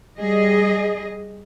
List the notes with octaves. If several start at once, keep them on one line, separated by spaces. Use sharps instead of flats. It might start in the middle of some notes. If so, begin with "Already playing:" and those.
G3 G#4 D#5